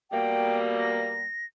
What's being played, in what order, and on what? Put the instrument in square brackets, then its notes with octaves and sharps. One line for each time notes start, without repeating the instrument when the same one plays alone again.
[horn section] B2 G3 A#3 [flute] G5
[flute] A#6